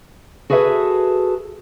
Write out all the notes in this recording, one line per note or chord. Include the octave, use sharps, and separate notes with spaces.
F#4 G#4 A4 B4 E5